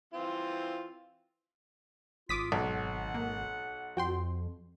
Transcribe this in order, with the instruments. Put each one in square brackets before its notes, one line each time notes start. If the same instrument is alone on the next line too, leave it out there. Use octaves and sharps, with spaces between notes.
[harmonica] E3 C4 F4
[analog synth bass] G#1 [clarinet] F4 [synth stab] D6 D#6 B6
[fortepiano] B1 [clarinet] F#5
[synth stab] A#3
[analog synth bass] F2 [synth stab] F#4 G5 C6